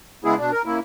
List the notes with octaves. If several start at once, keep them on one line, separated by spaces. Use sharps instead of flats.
C#3 G#3 B3 E4 G#4
B2 D4
A#4
C#3 A#3 E4